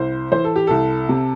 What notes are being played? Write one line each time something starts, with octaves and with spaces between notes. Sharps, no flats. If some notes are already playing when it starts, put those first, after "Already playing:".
Already playing: C2 C5
E3 C5
A4
G4
C2 A4
C3